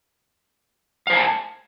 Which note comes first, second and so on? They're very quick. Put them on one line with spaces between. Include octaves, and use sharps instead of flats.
F5 C5 G#5 A5